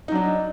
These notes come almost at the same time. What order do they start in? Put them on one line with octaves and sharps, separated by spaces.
D#4 F#3 D4